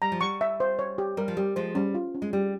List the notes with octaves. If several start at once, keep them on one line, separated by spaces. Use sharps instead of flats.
G3 A#5
F3
G3 C#6
E5
C5
C#5
G4
G3 A#4
F3
G3 G4
F3 G#3 C5
G3 C#4
F4
C#4
G#3
G3 G4